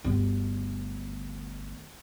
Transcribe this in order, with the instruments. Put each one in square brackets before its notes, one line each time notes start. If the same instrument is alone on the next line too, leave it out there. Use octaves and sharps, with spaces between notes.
[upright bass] G1 D2